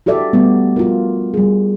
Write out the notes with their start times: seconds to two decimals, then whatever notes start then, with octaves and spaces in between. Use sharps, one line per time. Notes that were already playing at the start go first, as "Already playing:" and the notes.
0.06 F#4 G4 A4 D5 E5
0.33 G3 A3 B3
0.76 F4 F#4 A#4
1.34 G3 G#4